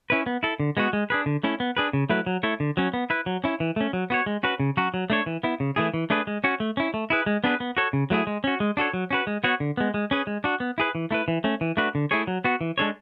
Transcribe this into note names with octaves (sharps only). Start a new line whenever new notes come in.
C#4 E4 B4
B3
E4 A4
D3
G#3 B3 F#4
G#3
D4 G#4 B4
D3
A3 C#4 E4
B3
D4 G#4 B4
C#3
F#3 A3 E4 B4
F#3
A3 E4 A4 C#5
D3
F#3 C#4
B3
E4 B4
F#3
C#4 E4
E3
A3 C#4
F#3
B3 F#4 C#5
G#3
C#4 F#4 B4
C#3
F#3 C#4 F#4
F#3
A3 D4 A4 C#5
E3
B3 E4
C#3
E3 A3 E4 G#4
E3
A3 D4 G#4 B4
G#3
C#4 F#4 C#5
A3
C#4 E4
A3
E4 G#4 B4
G#3
B3 D4 G#4 B4
B3
F#4 A4 C#5
C#3
F#3 A3 E4 G#4
G#3
C#4 F#4
G#3
D4 F#4 A4 C#5
F#3
C#4 F#4 B4
G#3
B3 F#4 C#5
D3
G#3 B3
G#3
C#4 G#4 B4
G#3
D4 F#4
B3
E4 G#4 B4
E3
A3 E4 B4
E3
A3 C#4
E3
A3 D4 F#4 B4
D3
A3 E4 G#4 C#5
F#3
B3 F#4
E3
G#3 D4 A4 C#5